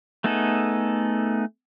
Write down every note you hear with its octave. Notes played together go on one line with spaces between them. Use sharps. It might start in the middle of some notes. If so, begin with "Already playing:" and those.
A3 B3 D#4 G#4 A4